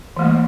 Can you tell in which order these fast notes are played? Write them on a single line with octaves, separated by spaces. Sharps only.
E3 A3 A#3 G3